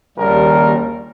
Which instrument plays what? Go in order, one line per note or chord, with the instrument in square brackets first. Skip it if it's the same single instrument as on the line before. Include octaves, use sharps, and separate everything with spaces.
[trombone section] A#1 C#3 A#4 [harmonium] D#2 G3